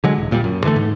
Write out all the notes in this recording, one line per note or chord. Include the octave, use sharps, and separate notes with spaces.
D3 F#3 G#3
D#1
A#1 A#2 D3 G3
F#2
D3 E3 G#3 A3
G#2